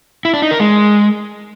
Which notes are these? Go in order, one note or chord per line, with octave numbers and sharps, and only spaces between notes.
E4
D4
D#4
A#4
G#3